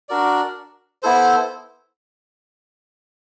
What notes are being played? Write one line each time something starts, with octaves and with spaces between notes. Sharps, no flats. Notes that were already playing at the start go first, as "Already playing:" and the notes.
D4 F#4 A#4 D5
B3 E4 A4 C5